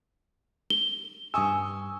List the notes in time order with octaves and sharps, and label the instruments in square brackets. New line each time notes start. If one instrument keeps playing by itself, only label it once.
[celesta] G7
[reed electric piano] G2 E6 [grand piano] G#5 C#6 D#6